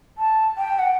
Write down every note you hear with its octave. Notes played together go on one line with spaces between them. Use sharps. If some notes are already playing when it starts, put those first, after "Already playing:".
A5
G5
F#5